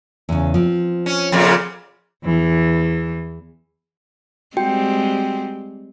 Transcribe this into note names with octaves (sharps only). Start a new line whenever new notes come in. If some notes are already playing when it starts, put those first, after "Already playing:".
E2 C#3
F3 C4
C#4
F2 A#2 C#3
E2 E3
G3 G#3 C4 F#4 G5